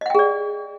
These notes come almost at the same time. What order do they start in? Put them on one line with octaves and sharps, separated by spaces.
D#5 F#5 G5 G#4 D5